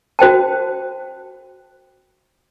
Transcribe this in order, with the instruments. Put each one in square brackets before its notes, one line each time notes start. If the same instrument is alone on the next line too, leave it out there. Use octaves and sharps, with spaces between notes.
[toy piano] F#4 C5 G5 A5